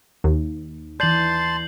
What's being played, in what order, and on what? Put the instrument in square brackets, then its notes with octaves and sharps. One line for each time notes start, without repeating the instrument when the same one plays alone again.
[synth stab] D#2
[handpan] E3 D5 [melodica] A5 C6 [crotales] G6 C7 F#7